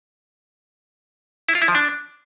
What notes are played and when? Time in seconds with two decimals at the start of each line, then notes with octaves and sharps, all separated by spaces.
1.49 E4
1.55 F4
1.62 E4
1.68 F3
1.75 D4